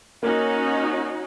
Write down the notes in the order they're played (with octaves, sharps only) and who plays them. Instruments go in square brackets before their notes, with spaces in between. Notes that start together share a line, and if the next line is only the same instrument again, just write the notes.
[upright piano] A#3 [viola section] C#4 D#4 F#4